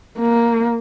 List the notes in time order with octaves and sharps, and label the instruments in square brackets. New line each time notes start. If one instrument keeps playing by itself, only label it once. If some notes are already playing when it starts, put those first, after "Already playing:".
[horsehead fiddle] A#3